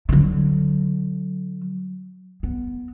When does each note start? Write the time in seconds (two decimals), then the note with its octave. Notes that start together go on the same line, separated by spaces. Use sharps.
0.09 D3 F#3
2.43 B3